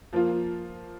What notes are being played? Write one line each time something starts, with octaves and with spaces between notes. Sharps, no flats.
F3 A#3 F4